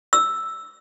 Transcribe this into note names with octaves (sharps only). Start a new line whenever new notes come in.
E6